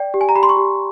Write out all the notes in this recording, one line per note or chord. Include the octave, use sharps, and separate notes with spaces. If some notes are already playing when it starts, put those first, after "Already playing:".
Already playing: D5 G5
G4
G#5
A#5
G4 B5
C6
C#6
G4